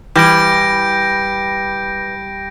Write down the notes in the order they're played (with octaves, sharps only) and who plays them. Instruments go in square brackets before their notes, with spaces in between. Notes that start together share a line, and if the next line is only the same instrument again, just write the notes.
[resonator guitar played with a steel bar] E3 [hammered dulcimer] G3 [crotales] G6 A#6 D7